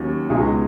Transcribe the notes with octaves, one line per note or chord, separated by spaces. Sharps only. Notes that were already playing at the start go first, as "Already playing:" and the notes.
Already playing: D#2 D#3 F#3 C#4
C#2 B2 G#3 D#4 G#4